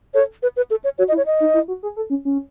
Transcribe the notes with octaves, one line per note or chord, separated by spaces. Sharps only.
A4 C#5
B4
B4
A4
C#5
F#4 C#5
D#5
E4
C#5
D#5
D#4
E4
F#4
G#4
A4
C#4
C#4